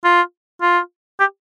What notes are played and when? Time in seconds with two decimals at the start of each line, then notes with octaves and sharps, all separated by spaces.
0.04 F4
0.62 F4
1.20 G4